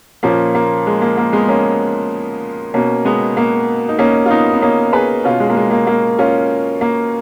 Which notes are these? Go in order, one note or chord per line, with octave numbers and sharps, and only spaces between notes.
A#2 F3 A#3 C#4
A#3
G#3
A#3
A#3
G#3 B3
A#3 C#4
B2 A#3 C#4
G#3 B3
A#3
D#4
A#3 C#4
F4
B3 D#4
B3
A#3 C#4
G#4 B4
B2 C#4 F4
G#3
A#3
G#3
A#3
A#3
C#4 F4
A#3